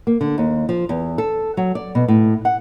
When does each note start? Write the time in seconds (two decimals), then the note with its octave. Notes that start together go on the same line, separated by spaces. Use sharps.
0.07 A#3
0.21 D3
0.38 D#2
0.69 F3
0.89 E2
1.18 A4
1.57 F#3
1.75 D5
1.95 B2
2.08 A2
2.45 F#5